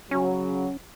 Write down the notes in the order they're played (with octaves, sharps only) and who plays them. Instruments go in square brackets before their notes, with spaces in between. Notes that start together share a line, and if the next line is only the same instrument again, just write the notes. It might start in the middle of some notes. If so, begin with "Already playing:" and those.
[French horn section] C#3 F#3 [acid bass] C#4